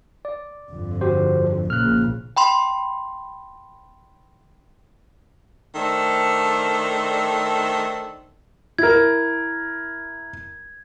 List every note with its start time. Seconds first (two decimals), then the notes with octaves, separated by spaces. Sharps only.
0.25 D5
0.71 G1 F2 D3
1.01 F#4 G4 C5
1.70 A#1 A#2 C#3 F6 F#6
2.37 G5 B5 C6
5.75 D#3 A3 D4 A4 C5 D5
8.79 E4 A#4 G#6